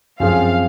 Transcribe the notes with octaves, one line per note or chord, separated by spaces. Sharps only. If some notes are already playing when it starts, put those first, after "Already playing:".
F#2 F3 C4 F4 G#4 F5